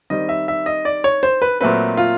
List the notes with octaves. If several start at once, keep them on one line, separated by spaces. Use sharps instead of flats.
D#3 G3 C4 D#5
E5
E5
D#5
D5
C#5
C5
B4
A#2 F#3 A3 C4 B4
F4